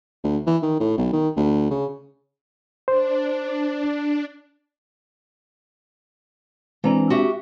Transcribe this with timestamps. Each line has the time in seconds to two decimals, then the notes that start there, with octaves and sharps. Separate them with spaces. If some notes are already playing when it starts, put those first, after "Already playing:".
0.24 D2
0.47 E3
0.63 D#3
0.80 A2
0.98 B1
1.13 D#3
1.37 D2
1.71 C#3
2.88 D4 C5
6.84 E3 G#3 C4 D4 A#5
7.10 F#4 G4 E5